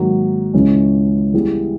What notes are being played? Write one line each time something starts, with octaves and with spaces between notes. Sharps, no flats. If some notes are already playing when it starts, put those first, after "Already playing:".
Already playing: G#2 D#3 F#3 A#3
C#2 C#3 E3 G#3 C#4
E3 G3 B3 E4 G#4